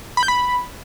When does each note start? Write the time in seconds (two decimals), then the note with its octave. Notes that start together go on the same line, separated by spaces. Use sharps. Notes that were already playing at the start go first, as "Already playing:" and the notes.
0.17 B5
0.23 G6
0.28 B5